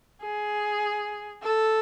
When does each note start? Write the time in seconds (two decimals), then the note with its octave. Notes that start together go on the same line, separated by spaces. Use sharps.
0.22 G#4
1.43 A4